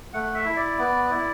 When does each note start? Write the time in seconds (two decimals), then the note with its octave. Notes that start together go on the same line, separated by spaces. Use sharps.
0.13 A3 F#5
0.34 E5
0.45 E4
0.56 D5
0.78 B3
1.11 E4